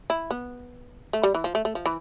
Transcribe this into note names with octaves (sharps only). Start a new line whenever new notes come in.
E4
B3
A3
G3
E3
F3
A3
A3
F3
E3